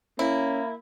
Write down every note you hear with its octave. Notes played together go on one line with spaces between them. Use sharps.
A#3 C#4 E4